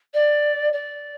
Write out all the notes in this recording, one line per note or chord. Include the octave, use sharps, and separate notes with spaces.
D5
D5